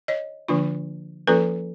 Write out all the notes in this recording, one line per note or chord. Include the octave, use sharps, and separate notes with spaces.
C#5 D#5
D3 F3 A#3 D4 F4
F3 A#3 C#4 F4 A4 B4